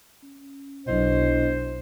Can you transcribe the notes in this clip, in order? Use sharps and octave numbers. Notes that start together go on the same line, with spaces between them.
C#4
B1 D4 E4 C5 D#5